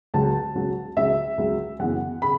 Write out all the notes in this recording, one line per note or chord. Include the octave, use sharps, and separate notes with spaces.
C#2 C#3 F#3 A5
C#2 C#3 F#3
C#2 C#3 F#3 E5
C#2 C#3 F#3
F#2 C#3 E3 B3 F#5
C#3 B5